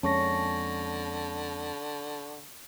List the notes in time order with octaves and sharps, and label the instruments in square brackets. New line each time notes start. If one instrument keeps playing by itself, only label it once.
[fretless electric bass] F2 G#3 A#3 [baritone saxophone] D3 [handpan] C#4 [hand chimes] A5 C#6 A#6